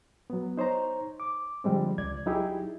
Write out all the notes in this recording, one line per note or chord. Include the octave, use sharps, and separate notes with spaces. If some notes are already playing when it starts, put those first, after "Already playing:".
F#3 B3
D#4 C5 C#5 A#5
D6
D3 F3 G3 G#3 C4
C#2 D5 G#6
F#3 D#4 E4 G4 G#4